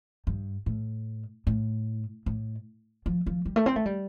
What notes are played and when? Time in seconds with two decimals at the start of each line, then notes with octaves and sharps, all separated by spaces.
0.27 G2
0.66 A2
1.47 A2
2.26 A2
3.06 F3
3.26 F3
3.45 G3
3.56 A3
3.66 C4
3.76 A3
3.86 G3